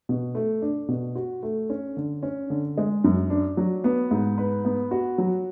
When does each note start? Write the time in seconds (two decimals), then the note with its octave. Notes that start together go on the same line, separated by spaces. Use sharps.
0.09 B2
0.35 A3
0.62 D4
0.88 B2
1.15 F#4
1.43 A3
1.70 C#4
1.97 D3
2.23 C#4
2.50 D3
2.78 G#3
3.04 F#2
3.30 D4
3.57 F#3
3.84 B3
4.11 G#2
4.38 B4
4.65 B3
4.91 F#4
5.18 F#3